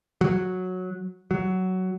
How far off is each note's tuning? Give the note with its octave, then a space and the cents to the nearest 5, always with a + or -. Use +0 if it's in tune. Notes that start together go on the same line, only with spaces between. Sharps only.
F#3 -10
F#3 +10